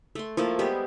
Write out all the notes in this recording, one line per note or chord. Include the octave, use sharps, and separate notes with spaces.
A3 C6
F3 A3 A#3 E4
G3 G#3 B3 G4